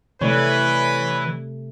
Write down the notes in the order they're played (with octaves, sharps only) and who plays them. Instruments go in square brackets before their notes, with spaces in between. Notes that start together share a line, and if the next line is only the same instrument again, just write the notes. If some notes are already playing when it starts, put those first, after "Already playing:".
[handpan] C3 A3 [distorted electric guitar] E3 [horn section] B4 [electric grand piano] C#5 D5